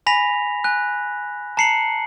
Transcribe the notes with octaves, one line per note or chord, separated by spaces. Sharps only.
G#5 B5 A#6 B6 F7
G#5 F#6
A5 A#5 C7 C#7 F#7